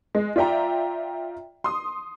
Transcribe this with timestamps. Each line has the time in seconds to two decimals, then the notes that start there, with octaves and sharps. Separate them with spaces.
0.15 G#3
0.36 F4 D5 E5 G5 A#5
1.64 C6 D#6